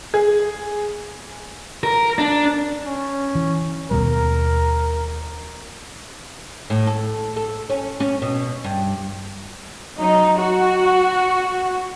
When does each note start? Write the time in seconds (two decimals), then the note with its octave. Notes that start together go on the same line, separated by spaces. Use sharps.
0.14 G#4
1.83 A#4
2.18 D4
2.86 C#4
3.35 E3
3.91 D#2 B2 G3 A#4
6.70 A2
6.87 A4
7.36 A4
7.70 C#4
8.00 C#4
8.22 B2
8.64 G2
9.99 F#3 D#4
10.38 F#4